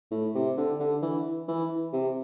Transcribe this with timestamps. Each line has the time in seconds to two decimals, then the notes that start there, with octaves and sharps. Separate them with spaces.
0.11 A2
0.35 C3
0.57 D3
0.79 D3
1.02 E3
1.48 E3
1.93 C3